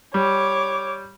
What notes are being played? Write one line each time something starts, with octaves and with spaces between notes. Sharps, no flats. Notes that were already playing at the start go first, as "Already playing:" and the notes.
G3 C#5 D6